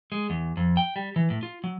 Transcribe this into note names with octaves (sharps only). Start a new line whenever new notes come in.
G#3
E2
F2
G5
G3
E3
A2
F4
F#3